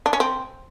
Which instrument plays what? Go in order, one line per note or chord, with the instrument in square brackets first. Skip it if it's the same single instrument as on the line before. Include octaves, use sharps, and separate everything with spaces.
[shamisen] D4
C#4
C4